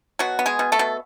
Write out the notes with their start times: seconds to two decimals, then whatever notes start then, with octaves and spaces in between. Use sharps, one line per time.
0.19 B2 F#3 F#4
0.39 B3
0.46 G#3 G#4
0.59 B2
0.72 A3 A4
0.79 B2